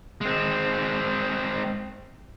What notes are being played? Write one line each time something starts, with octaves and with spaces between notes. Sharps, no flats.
G#3 C4